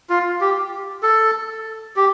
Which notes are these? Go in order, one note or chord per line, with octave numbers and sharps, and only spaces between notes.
F4
G4
A4
G4